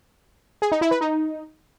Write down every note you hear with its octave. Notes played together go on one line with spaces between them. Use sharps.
G#4
D#4
E4
B4
D#4